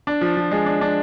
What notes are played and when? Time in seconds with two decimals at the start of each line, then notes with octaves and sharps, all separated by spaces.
0.07 D4
0.21 F3
0.37 F3
0.52 G#3
0.66 D4
0.81 D4